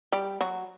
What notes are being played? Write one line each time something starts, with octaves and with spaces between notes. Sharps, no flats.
G3 G4
F#3 F#4